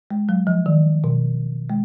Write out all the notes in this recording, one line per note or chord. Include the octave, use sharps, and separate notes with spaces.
G#3
F#3
F3
D#3
B2
G#3